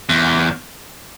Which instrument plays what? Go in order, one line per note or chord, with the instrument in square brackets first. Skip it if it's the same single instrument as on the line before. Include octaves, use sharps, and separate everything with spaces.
[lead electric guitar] E2